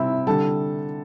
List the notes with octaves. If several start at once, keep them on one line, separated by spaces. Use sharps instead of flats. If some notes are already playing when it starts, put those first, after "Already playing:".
Already playing: C3 G3 C4 E4 E5
D3 G3 A4 A5